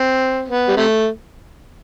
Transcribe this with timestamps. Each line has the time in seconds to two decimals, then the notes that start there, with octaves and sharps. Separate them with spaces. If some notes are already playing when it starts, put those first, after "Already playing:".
Already playing: C4
0.48 B3
0.68 G3
0.77 C3 A3